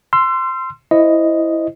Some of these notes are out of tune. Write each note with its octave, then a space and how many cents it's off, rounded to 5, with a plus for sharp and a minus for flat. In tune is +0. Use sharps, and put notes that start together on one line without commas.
C6 -5 E6 +40
E4 +0 C5 +0 D#5 +0